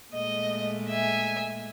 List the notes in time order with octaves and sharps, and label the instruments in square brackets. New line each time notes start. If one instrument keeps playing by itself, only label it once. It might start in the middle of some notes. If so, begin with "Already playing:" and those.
[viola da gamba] A#2 G#3 A3 [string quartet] D#5
[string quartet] E5 G#5